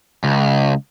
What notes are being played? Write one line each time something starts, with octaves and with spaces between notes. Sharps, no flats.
C#2